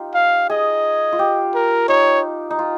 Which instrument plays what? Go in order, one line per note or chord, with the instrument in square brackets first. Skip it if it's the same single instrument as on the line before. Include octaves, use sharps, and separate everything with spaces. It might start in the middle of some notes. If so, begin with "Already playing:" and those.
Already playing: [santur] D#4 F4 G4
[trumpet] F5
[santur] G#4 [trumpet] D#5
[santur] F4
G4
[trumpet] A#4
[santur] D#4 [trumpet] C#5
[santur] D#4
F4